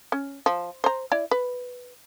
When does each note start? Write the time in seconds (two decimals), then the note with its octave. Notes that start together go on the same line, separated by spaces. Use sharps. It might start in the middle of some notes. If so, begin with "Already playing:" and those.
0.12 C#4
0.46 F3
0.84 C5 A#5
1.12 E4 D5
1.31 B4